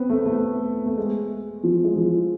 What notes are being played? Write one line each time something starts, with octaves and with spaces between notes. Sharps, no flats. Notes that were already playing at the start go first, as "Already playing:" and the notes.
Already playing: B3 C4
A3
A3
B3
A3
G#3
F3
G#3
F3